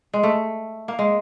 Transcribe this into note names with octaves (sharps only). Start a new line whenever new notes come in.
G#3
A3
A#3
G#3